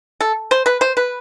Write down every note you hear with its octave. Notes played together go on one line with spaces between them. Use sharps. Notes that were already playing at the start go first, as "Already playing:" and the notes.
A4
C5
B4
C5
B4